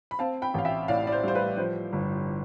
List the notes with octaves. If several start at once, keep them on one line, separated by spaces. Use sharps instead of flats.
B5
C4 F5 A5
G5 B5
A1 F5
E5 G5
A2 D5 F5
D5
C5
G3 C5
B4
F3 C5
G1